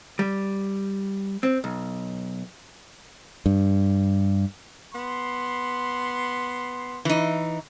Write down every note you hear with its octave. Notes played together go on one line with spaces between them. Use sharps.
G3
C4
B1
G2
B3 B5 C6
E3 D#4